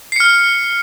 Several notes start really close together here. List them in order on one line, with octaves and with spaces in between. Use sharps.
C7 C#7 F6